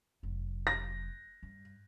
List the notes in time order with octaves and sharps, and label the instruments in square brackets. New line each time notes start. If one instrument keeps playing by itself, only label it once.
[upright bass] F1 F#3
[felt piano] A#6
[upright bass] G2